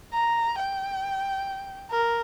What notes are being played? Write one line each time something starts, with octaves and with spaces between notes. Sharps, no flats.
A#5
G5
A#4